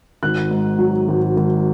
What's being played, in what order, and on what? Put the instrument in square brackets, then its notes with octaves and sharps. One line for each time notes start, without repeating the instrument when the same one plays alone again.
[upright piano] G#1 F#6
G#2
F#3
G#1
G#1